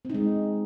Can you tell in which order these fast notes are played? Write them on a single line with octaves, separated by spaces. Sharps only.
C4 D#4 G#3